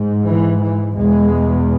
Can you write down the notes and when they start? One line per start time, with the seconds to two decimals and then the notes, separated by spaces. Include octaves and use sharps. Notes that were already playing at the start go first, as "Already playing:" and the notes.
Already playing: G#2
0.25 E3
0.60 E3
0.96 E2 B2 G#3